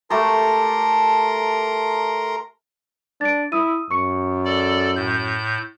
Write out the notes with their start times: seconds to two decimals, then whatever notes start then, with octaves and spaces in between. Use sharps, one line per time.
0.10 A3 G4 A4 A#4 A#5 C6
3.21 D4 A6 D7
3.52 E4 D#6 E6 D#7
3.91 F#2 C#6 C#7
4.45 A4 D5
4.96 A2 G6